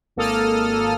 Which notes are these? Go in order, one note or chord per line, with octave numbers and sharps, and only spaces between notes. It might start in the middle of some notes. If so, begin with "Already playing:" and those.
G#1 A#3 A4 D#6 F6